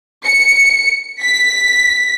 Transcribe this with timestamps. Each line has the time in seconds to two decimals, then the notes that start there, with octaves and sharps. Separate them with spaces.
0.25 C#7
1.23 B6